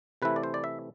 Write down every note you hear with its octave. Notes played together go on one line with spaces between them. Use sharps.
C3 E3 A3 E4 B4
D5
C5
D5
E5